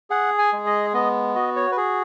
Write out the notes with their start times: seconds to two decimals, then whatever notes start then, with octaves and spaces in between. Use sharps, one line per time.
0.10 G#4 F#5
0.38 G#5
0.53 G#3
0.66 D#5
0.94 B3 D#5
1.35 F#4 D#5
1.56 C#5
1.72 B4
1.77 G#4